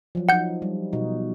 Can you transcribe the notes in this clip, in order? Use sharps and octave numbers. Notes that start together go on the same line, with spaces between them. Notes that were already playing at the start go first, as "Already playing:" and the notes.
F3 F#3
F3 D#4 F#5 G6
G3
B2 D#4 F#4